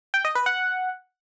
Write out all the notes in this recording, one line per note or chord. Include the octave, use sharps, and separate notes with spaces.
G5
D#5
B4
F#5